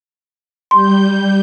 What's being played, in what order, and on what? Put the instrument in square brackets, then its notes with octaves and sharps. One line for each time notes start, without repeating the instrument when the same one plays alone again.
[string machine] G3 G6 [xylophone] C6